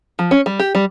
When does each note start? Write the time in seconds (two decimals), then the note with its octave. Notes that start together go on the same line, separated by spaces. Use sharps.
0.19 F3
0.31 C#4
0.46 G3
0.59 G4
0.75 G3